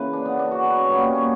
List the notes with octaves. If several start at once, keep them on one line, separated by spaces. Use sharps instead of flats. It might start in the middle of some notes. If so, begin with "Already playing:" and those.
Already playing: C#3 E3 A#3 B4
D4
B3
D4
F#4
B4
C#4
A#2 G3 A#3 B3
C#4
C#4